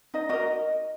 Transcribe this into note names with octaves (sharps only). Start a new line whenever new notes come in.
D#4 D#5
F#4 A#4 D#5